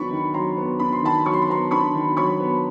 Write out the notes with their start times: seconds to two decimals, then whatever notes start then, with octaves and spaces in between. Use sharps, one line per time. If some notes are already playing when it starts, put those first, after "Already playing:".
Already playing: D#3 F#3 B3 D4 B5 C#6
0.11 D#3
0.34 F#3 A#5 C6
0.57 B3
0.80 D4 B5
0.93 C6
1.02 D#3 A5 B5
1.25 F#3 C#6
1.33 C6
1.42 B5
1.48 B3 A#5 C6
1.71 D4 B5 C#6
1.94 D#3
2.17 F#3 B5 C#6
2.40 B3